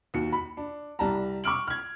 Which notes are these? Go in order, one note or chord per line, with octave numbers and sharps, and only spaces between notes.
D#2 F#4 C#7
B5
D4
C2 G3 A5 A#5
C#6 D6 E6 F6 D7 F#7
F6 G#6